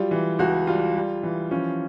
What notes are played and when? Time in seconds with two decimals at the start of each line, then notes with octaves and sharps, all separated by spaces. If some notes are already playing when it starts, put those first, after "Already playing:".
Already playing: F#3 G3 F4
0.11 E3
0.39 C#2 F#4
0.67 G3 F4
0.95 G3
1.23 E3
1.51 F3 C#4